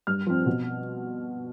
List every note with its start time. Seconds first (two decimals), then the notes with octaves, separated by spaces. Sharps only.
0.07 G2 F6
0.26 F3 C4
0.46 B2